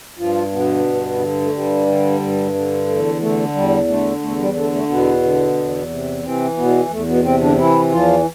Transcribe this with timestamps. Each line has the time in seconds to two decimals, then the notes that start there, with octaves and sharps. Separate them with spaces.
0.18 G2 F3 F4
0.52 B2 D3 B3
0.86 G2
1.20 D3
1.41 A3
1.53 G2 G3
1.87 D3
2.20 G2
2.54 D3
2.87 E2 A3
3.21 D3 A3
3.54 E2 G3
3.88 D3 A3
4.21 E2 A3
4.38 G3
4.55 D3 A3
4.72 A3
4.89 E2 B2 B3
5.23 D3
5.56 E2
5.89 C3
6.23 C3 E3 C4
6.57 E2 B2 B3
6.90 E2 A3
7.08 B2 B3
7.24 C3 C4
7.41 D3 D4
7.58 E3 E4
7.91 E2 F3 F4